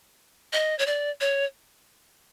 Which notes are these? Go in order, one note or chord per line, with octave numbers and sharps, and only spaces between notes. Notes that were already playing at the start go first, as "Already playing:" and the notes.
D#5
C#5
D5
C#5